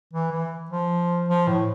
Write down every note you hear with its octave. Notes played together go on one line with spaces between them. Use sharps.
E3
E3
F3
F3
A2